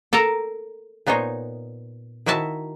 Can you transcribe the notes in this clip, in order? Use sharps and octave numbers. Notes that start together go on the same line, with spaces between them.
A4 A#4 A5 A#5
A#2 B3 D#4 C5 C#5
D#3 E4 F#4 E5 A5